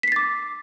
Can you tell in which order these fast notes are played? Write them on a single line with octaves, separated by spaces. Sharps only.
B6 C7 A6 D6